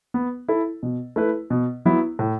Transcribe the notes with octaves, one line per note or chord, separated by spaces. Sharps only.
B3
E4 A4
B2
A3 E4 B4
B2
F#3 B3 E4
A2